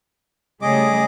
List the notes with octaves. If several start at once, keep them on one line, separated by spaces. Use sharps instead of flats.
C#3 G3 A3 G#4 D#5 D6